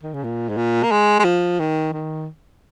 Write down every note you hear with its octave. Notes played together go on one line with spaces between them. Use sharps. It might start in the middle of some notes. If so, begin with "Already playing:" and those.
D#3
C#3
A#2
G#2
A#2
A#3
G#3
G#3
F3
D#3
D#3